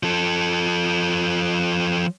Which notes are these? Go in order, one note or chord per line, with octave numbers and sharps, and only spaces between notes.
F3 A4